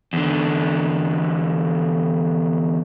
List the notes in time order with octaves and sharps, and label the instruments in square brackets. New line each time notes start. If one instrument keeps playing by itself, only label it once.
[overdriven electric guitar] E2 D3